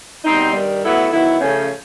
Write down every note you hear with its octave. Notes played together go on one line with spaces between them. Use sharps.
B2 G3 C4 D#4
G2 D#3 G3
A2 F#3 B3 E4 A4
D#3 F#3 B3 E4
C#3 F3 A3 C#4